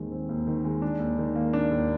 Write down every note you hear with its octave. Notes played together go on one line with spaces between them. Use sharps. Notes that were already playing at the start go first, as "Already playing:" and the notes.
Already playing: D#2 D#3 G#3 C4
C4
D#2
D#3
G#3
D4
D#2
D#3
A#3
D4
D#2